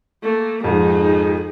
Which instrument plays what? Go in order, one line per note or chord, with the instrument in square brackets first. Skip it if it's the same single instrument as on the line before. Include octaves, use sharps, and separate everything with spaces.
[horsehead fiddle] A3 A#3
[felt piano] F2 G#2 [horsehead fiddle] D#4 G#4